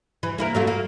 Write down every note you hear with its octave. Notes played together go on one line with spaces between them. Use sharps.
E3
A#3 E4 A#4
F#3 A3 F4
A#3